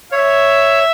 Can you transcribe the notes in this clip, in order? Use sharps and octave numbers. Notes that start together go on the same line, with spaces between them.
C#5 E5